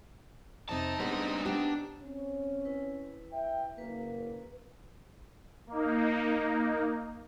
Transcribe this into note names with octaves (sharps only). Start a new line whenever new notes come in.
F2 C3 C4 D#4 A5
G3 G#3 B3 D4
B3 D4 G4
C4 C#4
E4 B4
E5 G5
F#1 A#3 B4
A#3 D#4